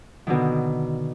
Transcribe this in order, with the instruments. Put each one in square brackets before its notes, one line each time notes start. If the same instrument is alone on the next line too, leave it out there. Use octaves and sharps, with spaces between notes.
[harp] B2 D3 D#3